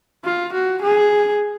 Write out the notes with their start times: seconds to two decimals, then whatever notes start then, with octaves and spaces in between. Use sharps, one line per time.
0.25 F4
0.53 F#4
0.82 G#4